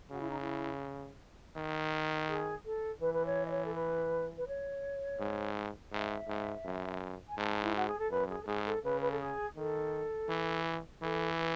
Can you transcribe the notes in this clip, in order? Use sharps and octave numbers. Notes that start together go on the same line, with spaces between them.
C#3 F#4
E4
D#4
E4
D#3
G#4
A4
E3 B4
B4
C#5
D#5
C#5
A4
B4
B4
C#5
G#2
G#2 E5
G#2
F#2
G#5
G#2 A5
E4
F#4
G#4
A4
F#2 B4
G#4
A4
G#2 G#4
A4
C#3 B4
B4
A4
G#4
D#3 A4
E3
E3 A4
B4